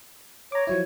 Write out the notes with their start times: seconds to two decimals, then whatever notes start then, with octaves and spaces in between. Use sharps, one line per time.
0.52 C#5 A#5 D6
0.67 F3 F#3 E4 C#5